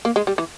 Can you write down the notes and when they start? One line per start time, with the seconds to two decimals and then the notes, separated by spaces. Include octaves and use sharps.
0.05 A#3
0.16 G#3
0.27 G3
0.38 E3